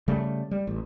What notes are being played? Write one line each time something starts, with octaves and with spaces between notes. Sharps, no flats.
C#3 G3 A3
G3
A1